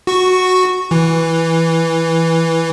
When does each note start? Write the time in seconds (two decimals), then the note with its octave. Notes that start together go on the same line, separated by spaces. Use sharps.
0.07 F#4 C#6
0.91 E3